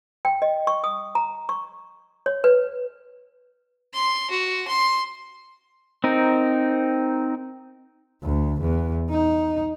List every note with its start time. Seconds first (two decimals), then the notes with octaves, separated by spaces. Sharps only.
0.25 G5
0.42 D#5
0.67 C#6
0.84 D#6
1.15 A#5
1.49 C#6
2.26 C#5
2.44 B4
3.94 C6
4.31 F#4
4.67 C6
6.04 C4 D#4 A#4
8.23 D2
8.61 E2
9.10 D#4